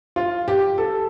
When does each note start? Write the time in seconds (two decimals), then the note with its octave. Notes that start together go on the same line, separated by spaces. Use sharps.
0.16 F4
0.48 G4
0.78 A4